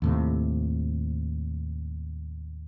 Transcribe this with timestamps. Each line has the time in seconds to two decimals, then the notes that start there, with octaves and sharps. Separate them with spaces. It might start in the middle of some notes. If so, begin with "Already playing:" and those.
0.02 D#2 A2 C3